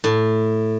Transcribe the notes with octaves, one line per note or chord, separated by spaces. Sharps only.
A2